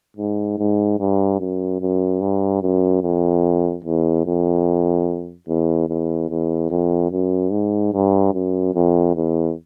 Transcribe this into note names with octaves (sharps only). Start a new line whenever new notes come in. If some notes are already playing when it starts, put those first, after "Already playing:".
G#2
G#2
G2
F#2
F#2
G2
F#2
F2
E2
F2
E2
E2
E2
F2
F#2
G#2
G2
F#2
F2
E2